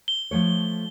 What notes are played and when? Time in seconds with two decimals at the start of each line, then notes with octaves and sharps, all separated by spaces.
0.08 G7
0.31 F3 A3 C#5